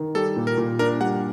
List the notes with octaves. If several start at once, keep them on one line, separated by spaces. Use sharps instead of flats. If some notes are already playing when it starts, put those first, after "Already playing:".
Already playing: D#3
G3 A4
A#2
A#4
A#2
D4 A#4
G3 F#5